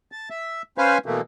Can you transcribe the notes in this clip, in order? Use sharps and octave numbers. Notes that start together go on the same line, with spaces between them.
A5
E5
C#4 B4 C5 F5 G#5
B2 E3 A3 A#3